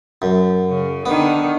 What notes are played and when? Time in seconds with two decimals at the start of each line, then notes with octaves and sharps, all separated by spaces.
0.22 F#2
0.70 C#3
1.06 D3 D#3 B3